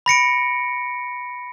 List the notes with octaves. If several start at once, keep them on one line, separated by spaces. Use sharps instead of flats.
B5 A#6 C#7 D7